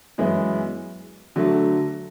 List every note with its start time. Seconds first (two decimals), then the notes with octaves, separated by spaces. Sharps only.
0.18 F#2 E3 G#3 B3 E4
1.36 D3 F#3 A3